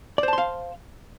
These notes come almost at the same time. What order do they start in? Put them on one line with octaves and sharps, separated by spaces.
D5 C5 A5 C6 F5